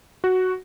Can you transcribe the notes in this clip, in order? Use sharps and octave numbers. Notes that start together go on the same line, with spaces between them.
F#4